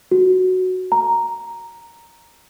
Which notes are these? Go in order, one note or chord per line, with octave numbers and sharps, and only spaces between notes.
F#4
A#5